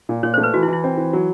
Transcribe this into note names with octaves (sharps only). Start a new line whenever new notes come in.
A#2
A#2 C#5
C5
A3
B4
E3 F#4
E4
E3
E4
C4
E3
F#3